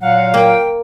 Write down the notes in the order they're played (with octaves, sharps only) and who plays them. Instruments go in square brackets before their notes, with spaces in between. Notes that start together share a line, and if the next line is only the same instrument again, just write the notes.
[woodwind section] A#2 F#3 F5 [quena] F#5
[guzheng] A#3 [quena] G5